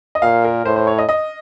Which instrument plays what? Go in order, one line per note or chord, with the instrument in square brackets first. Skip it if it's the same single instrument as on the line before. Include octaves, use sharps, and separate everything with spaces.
[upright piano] D#5
[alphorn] A#2 [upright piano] F5
[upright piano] A#4
[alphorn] A2 [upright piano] C5
[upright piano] C5
C#5
D#5
D#5